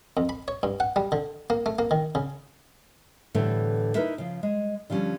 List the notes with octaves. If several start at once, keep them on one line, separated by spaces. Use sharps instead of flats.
F2
B5
C#5
G2
F#5
G3
D3
A#3
A3
A#3
D#3
C#3
A2 D3 E3 G3 A3 B3
D#4 E4 A#4 B4 E5
C#3 F3
G#3
D3 F3 G3 C#4